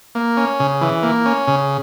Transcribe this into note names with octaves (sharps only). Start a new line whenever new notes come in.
A#3
C#4
C#3
E3
A#3
C#4
C#3